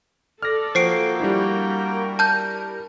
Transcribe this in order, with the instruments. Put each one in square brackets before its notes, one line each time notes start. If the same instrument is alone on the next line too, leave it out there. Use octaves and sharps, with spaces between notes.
[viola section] A4 [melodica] D5 [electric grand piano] F6 A#6
[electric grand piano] F3 [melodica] A#3 F#4 G5 [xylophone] C5 C7 D7
[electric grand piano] G3 D4 E4 [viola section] A#4
[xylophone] A5 F6 G6